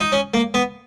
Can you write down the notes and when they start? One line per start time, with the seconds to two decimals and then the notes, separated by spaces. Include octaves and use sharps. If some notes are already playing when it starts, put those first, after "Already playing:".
0.01 D#4
0.12 C#4
0.34 A#3
0.54 B3